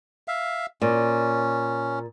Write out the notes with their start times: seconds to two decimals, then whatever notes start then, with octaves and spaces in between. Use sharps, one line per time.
0.28 E5 F5
0.81 A#2 C#4